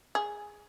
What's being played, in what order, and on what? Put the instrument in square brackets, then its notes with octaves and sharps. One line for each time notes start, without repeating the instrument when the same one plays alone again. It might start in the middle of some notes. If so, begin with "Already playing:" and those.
[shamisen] G#4